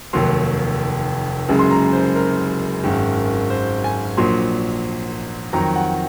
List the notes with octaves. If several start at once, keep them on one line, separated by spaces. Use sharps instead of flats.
F1 D#2 D#3 F#3 C6
F#1 F#2 C#3 G#3
C6
A#5
C5
A#4
G#1 F#2 D#3 G#3
C5
G#5
A#1 A#2 F#3 C6
F2 D#3 F#3 A#5
F#5